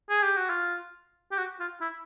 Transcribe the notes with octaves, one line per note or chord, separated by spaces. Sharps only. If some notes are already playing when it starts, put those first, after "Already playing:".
G#4
G4
F#4
F4
G4
F#4
F4
E4